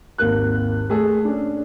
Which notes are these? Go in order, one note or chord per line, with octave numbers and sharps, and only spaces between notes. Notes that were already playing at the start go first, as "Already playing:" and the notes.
G#1 D#2 A#3 A#4 F#6
A3 G#4 A4
C#4 D4